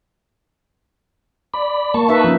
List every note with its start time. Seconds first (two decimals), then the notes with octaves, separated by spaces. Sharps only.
1.54 D5 B5
1.94 A#3 A5 C#6
2.09 D#4 B4 E5
2.24 F3 C#4